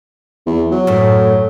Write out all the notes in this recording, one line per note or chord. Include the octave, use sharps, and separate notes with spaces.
E2
F#3
F#2 A2